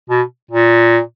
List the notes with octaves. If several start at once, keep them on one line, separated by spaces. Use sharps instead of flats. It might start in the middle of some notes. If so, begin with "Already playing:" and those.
B2
A#2